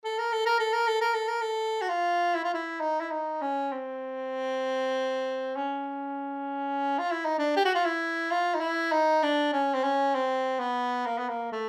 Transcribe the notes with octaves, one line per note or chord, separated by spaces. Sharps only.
A4
A#4
A4
A#4
A4
A#4
A4
A#4
A4
A#4
A4
F#4
F4
E4
F4
E4
D#4
E4
D#4
C#4
C4
C#4
F4
E4
D#4
D4
G4
F#4
F4
E4
F4
D#4
E4
D#4
D4
C#4
C4
C#4
C4
B3
A#3
B3
A#3
A3